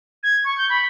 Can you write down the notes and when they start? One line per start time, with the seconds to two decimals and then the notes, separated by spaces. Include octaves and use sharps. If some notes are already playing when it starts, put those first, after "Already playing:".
0.23 G#6
0.44 C#6
0.57 G6
0.69 B5